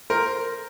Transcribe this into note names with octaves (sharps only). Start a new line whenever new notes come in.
A#4 C5